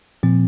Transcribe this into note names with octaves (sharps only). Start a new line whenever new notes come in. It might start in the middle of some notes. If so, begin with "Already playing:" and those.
A#2 F3 C4